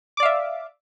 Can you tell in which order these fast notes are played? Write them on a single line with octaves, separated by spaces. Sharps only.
D6 D5 F5 E5